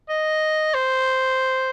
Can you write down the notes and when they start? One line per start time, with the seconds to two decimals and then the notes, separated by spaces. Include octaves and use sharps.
0.09 D#5
0.74 C5